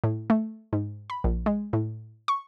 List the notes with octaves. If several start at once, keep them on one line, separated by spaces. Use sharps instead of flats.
A2
A3
G#2
B5
A#1
G#3
A2
C#6